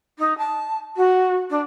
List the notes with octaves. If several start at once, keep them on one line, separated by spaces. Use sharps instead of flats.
D#4
A5
F#4
D4